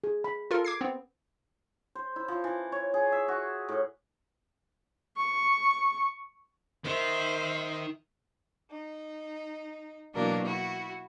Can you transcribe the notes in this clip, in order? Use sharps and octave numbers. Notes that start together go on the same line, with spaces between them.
G#4
B5
F4 A4 A#4
D6 G#6 C7
B3 C4
C5
E4
F3
E3
C#5
G#4
E5
F#4
A2
C#6
D#3 C5 E5
D#4
B2 E3 F#3 A#3 D4 A#4
E4 F#4